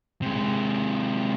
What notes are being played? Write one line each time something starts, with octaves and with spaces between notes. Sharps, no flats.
C3 G#3